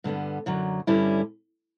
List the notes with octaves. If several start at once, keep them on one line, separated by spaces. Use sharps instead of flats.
G2 D3 G3 B3
F#2 D3 F#3
G2 D3 G3 C#4 E4